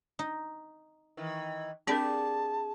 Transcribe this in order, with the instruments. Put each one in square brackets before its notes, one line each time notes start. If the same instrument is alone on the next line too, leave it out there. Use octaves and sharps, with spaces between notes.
[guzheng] D#4
[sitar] D#3 E3
[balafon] C4 D4 A#4 [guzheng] G4 D5 [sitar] G#4 [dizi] A5